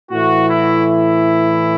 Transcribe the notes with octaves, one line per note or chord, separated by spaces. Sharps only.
A2 E3 F#4
E4
E4